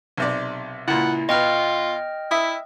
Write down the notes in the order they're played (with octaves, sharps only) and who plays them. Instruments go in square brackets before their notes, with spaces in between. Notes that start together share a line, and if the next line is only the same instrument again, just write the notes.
[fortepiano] B1 C3 D5
[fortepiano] C#2 A#2 [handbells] E4 [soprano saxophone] F#5
[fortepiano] B2 B4 [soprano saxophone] F4 [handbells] D#5 G5 F6
[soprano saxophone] E4 [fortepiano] E5 D#6